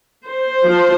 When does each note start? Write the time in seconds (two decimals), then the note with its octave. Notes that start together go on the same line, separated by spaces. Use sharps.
0.28 C5
0.65 F3